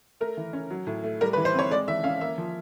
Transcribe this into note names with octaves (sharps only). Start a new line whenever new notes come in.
A3 A#4
E3
C#4
F#3
A2
A3
G3 A#4
B4
E3
C5
C4 C#5
G#3 D5
E3 E5
C#4 F5
A#3 E5
F3